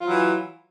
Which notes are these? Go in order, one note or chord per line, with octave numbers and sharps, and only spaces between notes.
E3 F#3 F4